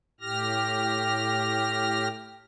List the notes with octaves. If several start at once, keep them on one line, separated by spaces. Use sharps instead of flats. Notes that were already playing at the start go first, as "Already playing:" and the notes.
A2 G4 F6 A#6